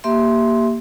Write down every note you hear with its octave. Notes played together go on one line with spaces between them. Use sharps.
A#3 G4 E5 C6